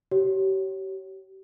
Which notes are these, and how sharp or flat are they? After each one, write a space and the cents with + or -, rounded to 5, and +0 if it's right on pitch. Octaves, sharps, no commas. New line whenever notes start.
G4 -35 C#5 +0